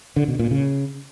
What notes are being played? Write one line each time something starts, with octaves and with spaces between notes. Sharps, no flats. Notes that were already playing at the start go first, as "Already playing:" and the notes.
D3
B2
A#2
C#3